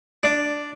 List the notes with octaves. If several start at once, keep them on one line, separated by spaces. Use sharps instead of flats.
D4